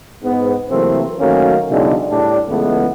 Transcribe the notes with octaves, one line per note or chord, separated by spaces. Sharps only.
G#2 B3
C3 E3 F#3 A3 A#3 C4
D#3 F#3 A3 A#3 C#4
B1 E2 C#3 G#3 D4 E4
A2 G3 D4
C#2 E3 G#3 A3 B3